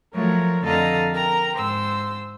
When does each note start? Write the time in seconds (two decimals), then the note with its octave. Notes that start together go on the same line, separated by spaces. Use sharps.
0.14 F3 F#3 A3 A#4 C#5
0.64 F2 D3 A4 D#5 F5 A#5
1.13 A#4 G5 A#5
1.55 G#2 C5 E6